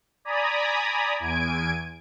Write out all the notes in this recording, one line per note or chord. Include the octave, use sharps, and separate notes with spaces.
D5 G#5 A#5 B5 D#6
E2 G#5 G#6 D7